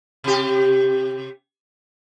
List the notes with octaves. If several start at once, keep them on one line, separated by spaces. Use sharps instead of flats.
C3 G4